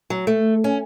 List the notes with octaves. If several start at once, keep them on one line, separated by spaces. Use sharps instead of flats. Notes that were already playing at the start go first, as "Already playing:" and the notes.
F#3
A3
C#4